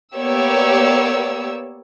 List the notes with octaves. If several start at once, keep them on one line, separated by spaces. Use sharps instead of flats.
A#3 B3 G4 C#5 D5 E6